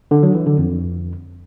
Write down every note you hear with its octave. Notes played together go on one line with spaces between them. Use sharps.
D3
F#3
E3
D3
F2